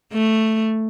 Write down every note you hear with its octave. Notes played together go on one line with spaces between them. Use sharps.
A3